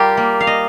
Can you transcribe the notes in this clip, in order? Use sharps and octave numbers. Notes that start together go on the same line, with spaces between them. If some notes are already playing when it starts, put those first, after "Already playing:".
Already playing: G3 F4 G4 A#4
A#3
F5
D#5